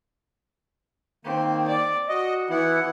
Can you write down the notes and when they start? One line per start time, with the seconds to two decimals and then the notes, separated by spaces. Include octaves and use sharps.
1.25 D#3 A#3 C4
1.68 D5
2.08 F#4 D#5
2.50 E3 B3 E4 F#5